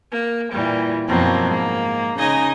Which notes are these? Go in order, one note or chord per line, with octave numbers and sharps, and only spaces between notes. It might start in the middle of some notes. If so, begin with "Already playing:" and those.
A#3
A#2 E3 G3
F#2 B2 F3 F#3 A#3 C4
G#2 A#3
C#3 D#4 D#5 G#5